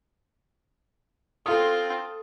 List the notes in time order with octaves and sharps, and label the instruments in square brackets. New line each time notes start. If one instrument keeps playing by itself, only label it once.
[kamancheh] C4 F4 [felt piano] A4 D#6